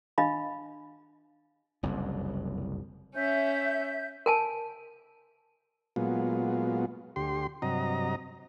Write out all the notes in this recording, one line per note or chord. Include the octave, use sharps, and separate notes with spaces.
D4 D#5 F5 B5
F#1 C2 F2
C#4 E5 G6
A#4 G#5 A5
A#2 F#3 G#3 B3 F4
D2 G4 C6
G2 C3 F#3 D#5 A#5